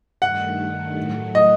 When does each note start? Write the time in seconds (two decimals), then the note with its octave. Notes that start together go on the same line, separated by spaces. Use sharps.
0.22 G2 D#3 A3 F#5
0.97 A2 F#3 A3
1.35 D#5